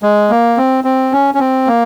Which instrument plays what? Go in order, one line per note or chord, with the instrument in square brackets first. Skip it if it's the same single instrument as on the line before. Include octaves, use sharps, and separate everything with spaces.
[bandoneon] G#3
A#3
C4
C4
C#4
C#4
C4
A#3